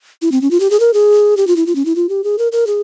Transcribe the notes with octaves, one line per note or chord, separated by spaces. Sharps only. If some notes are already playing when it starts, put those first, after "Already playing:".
E4
C4
C#4
F4
G4
G#4
A#4
G#4
G4
F4
E4
F4
C#4
E4
F4
G4
G#4
A#4
A#4
G#4